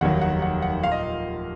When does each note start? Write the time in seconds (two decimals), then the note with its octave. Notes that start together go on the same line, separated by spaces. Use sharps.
0.01 F1 D#2 D#3 F#3 F#5
0.21 F#5
0.42 F#5
0.62 F#5
0.83 A#2 F3 F5
0.92 D#5